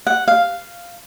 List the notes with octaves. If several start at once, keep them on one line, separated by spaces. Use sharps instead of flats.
F#5
F5